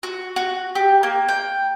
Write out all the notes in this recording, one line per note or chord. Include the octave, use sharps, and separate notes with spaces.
F#4
F#4
G4
A#3
G5